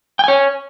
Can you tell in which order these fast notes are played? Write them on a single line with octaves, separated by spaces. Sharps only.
G5 G#5 C#5